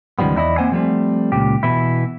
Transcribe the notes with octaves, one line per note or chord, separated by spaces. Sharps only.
C#2 D#3 F3 G3 B3
E2 D#4 E4 D5 D#5
A#3 C4 C5 F#5 G#5
F3 G3 A3 C4
C#2 A#2 G4
B2 E3 E4